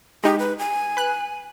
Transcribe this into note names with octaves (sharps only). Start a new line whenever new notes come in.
G#3 D#4 G4
B4
G#5
B4 F#6